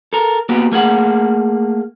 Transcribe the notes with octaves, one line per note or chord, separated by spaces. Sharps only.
A4 A#4
A#3 B3 F#4 G4
A3 A#3 G#4 F#5